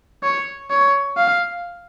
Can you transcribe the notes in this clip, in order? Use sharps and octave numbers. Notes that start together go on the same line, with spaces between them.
C#5
C#5
F5